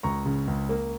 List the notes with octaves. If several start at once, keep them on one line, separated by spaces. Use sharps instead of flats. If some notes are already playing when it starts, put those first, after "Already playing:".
C#2 A#5 C#6
C#3
C#2
A#3